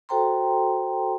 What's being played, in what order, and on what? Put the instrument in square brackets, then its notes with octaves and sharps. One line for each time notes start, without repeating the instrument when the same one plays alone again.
[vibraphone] F#4 A4 C5 G5 A#5 C6